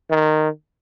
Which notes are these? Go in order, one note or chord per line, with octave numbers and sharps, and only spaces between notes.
D#3